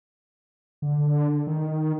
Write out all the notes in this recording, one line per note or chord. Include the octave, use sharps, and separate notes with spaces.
D3
D#3